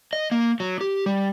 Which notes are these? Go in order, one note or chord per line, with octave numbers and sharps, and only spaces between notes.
D#5
A#3
F#3
G4
G3